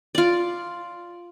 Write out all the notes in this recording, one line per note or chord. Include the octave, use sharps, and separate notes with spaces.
F4 D5